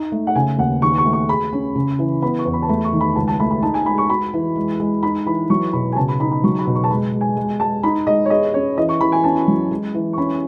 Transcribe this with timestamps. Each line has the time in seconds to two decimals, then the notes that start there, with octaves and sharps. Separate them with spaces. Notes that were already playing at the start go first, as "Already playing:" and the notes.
Already playing: D#4
0.12 A3
0.27 F#5
0.35 C#3 G#5
0.58 D#2 F#5
0.82 D#3 C#6
0.98 C#6
1.06 A3
1.13 C#6
1.29 G#4 B5
1.53 C#4
1.75 C#3
1.99 E3
2.22 B3 B5
2.39 C#6
2.45 E2
2.53 B5
2.62 A5
2.69 A3 B5
2.84 C#6
2.93 D#3
3.01 B5
3.16 C#2 A5
3.28 A5
3.40 A3 B5
3.51 B5
3.62 D#4 A5
3.74 G#5
3.86 G#3 B5
3.98 C#6
4.10 F#4 B5
4.33 E3
4.56 G#3
4.80 G#3
5.03 D#4 B5
5.26 E3 B5
5.50 F#3 C#6
5.73 B2 B5
5.92 G#5
5.96 C#3 A5
6.08 B5
6.20 D#4 B5
6.32 B5
6.44 F#3 C#6
6.59 B5
6.67 B2
6.75 C#6
6.84 A5
6.90 G#3 B5
7.13 G#3
7.21 G#5
7.37 G#3
7.60 G#3 A5
7.83 D#4 B5
8.07 G#3 D#5
8.25 C#5
8.30 G#4 D#5
8.54 C#4 C#5
8.77 E3 D#5
8.89 C#6
9.01 E3 B5
9.12 G#5
9.24 C#4 A5
9.48 F#3
9.71 G#3
9.94 E3
10.13 C#6
10.18 C#4 B5